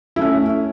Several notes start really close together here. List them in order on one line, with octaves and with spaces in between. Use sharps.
E4 A3 C#4